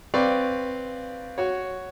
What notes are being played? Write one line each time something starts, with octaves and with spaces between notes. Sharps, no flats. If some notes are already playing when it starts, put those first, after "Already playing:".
C4 B4 D5 F5 C#6
F#4 C#5